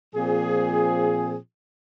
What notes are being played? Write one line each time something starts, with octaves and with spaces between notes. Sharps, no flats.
A#2 F3 C4 G#4